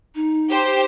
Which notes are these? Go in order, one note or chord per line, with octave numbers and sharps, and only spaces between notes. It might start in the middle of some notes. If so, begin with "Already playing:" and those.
D#4
G4 C5